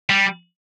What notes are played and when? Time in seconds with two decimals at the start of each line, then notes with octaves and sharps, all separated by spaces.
0.09 G3